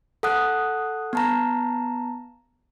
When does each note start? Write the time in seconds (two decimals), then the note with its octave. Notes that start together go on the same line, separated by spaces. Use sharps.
0.23 A4 F#5 D#6 F#6
1.13 B3 A5 A#5